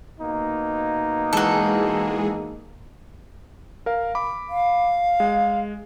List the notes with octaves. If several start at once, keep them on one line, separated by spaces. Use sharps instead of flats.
B2 A#3 D#4
E3 G#3 F#4 G#4 A4
A#4 F5
B5 D6
F5
G#3